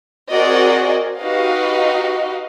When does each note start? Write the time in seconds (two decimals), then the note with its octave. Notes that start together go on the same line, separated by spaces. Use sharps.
0.31 C4 F#4 G#4 A#4 D5 D#5
1.20 D#4 F#4 G4 B4 D#5 F5